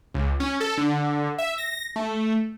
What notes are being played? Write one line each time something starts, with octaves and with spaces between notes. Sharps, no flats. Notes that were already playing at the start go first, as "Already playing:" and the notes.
C#2
C#4
A4
D3
E5
A#6
A3